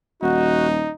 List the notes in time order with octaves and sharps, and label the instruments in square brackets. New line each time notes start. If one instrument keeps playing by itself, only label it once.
[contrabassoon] D#1 [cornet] D#4 [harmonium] F#4